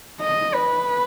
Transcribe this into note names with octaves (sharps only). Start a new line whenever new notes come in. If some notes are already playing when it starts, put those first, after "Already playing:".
D#5
B4